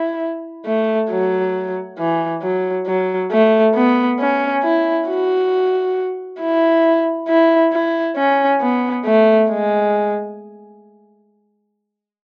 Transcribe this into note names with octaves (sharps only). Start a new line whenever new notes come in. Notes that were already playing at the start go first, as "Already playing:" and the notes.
Already playing: E4
A3
F#3
E3
F#3
F#3
A3
B3
C#4
E4
F#4
E4
E4
E4
C#4
B3
A3
G#3